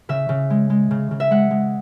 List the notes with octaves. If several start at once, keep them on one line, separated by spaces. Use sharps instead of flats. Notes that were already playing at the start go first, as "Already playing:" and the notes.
C#3 E5
C#3
G#3
G#3
C#3
C#3
E5
G#3 F#5
G#3